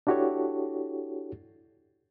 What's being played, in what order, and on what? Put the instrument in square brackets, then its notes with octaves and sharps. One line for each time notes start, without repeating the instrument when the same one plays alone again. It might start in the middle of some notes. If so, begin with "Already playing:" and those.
[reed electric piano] D4 E4 F#4 G4 A4 C#5